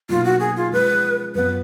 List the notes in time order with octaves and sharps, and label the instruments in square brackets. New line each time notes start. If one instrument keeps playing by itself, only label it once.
[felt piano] B2 F#3 A#3 D#4 [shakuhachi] F4
[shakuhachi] F#4
G#4
F4
[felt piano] F3 G#3 C#4 F4 G#4 [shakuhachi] B4
[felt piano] F#2 F3 B3 [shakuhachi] B4